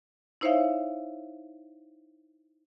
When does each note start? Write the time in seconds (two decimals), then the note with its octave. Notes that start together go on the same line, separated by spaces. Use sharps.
0.41 D#4 E4 C5 C#5 E5 F5